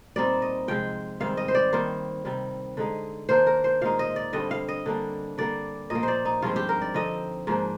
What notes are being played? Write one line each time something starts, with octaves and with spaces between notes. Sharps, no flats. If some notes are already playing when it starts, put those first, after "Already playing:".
A#2 G3 C4 D#4 D5
D#5
C3 F3 G#3 G5
G#2 D#3 G3 C4 F5
D#5
C5
D5
D#3 G3 A#3 C5
C3 D#3 G3
D3 G#3 D#4
D#3 A#3 D4 C5
A#4
C5
A#2 G#3 D#4 F5
D#5
D5
G2 D3 G3 C4 D#5
F5
D#5
D3 G3 A#3 D4
D3 G3 A#3 D5
A#2 F3 A#3 D#5
C5 D5
D#4
G2 F3 G#3 C4 F4
G4
A#4
D5
D3 F3 C4 D#4 D#5
G#2 F3 A#3 D4